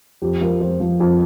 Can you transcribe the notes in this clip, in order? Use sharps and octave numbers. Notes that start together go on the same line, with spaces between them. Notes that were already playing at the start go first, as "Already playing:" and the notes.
F2 G4
F3 A#4
F2 C5
F3
F2